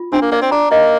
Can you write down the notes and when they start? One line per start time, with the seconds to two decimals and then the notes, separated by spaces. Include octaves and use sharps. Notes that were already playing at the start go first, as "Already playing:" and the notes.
Already playing: F4
0.13 C4 D4
0.22 A#3
0.32 A#3 D5
0.42 C4
0.51 D4 A#5
0.71 A#3 D#5